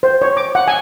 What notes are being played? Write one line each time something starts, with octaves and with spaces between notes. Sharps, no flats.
C5
C#5
D6
F#5
G#5